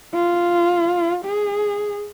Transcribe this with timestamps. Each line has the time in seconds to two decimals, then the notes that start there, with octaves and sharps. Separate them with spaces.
0.14 F4
1.25 G#4